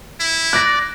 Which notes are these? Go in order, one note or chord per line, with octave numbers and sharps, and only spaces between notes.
E4
D5 F#6 A#6